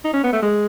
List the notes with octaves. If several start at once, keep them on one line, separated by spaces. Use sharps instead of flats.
D#4
C#4
B3
A3
G#3